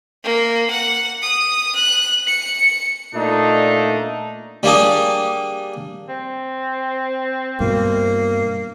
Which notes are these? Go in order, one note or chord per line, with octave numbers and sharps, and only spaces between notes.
A#3
F#5
D#6
F#6
C#7
A#2 A3 D4 D#4
G3 A#3 D4 G#4
C4
G2 B2 E3 A#3